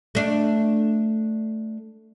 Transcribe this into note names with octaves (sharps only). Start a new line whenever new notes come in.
A3 D4